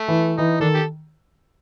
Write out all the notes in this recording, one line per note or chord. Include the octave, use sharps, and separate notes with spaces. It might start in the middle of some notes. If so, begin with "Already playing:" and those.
Already playing: A3
E3
E3 D#4
D#3 D4 A4
G4